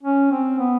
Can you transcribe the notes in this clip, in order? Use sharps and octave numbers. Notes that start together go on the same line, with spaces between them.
C#4
C4
B3